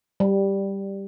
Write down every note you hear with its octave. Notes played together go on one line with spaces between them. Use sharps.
G3